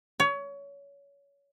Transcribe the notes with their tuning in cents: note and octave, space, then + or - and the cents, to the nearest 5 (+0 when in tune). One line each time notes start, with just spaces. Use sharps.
C#5 +25